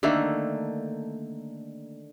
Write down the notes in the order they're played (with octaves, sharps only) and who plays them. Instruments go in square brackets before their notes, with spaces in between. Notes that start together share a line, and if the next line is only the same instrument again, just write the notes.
[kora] D3 D#3 A3 A#3